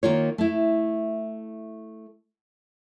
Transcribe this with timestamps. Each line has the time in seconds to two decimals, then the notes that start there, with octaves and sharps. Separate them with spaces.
0.03 D#3 A#3 F4 C#5
0.38 A3 E4